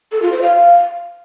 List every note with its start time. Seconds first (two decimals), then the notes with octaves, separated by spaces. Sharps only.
0.12 A4
0.22 F4
0.32 C5
0.42 F5